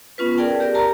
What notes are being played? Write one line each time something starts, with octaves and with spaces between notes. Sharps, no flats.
B3 C#4 F4 B4
G#4 A#4 D5 G5 A5
G4 A#4 D5
A#4 A5 A#5